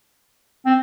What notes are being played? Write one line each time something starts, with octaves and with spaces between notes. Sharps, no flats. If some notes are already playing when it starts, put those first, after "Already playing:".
C4